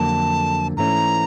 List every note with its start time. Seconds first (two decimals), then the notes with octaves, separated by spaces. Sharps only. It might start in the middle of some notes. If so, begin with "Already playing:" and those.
Already playing: F2 D3 F#3 A#3 A5
0.77 G#2 E3 A3 C#4 A#5